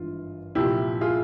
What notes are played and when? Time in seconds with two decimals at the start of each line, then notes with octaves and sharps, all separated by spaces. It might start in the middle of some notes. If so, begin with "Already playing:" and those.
Already playing: G#1 G2 E3 F4
0.55 C2 A#2 F3 E4 G4
1.01 F4 G#4